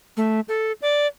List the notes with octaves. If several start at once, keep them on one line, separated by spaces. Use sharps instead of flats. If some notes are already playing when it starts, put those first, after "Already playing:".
A3
A4
D5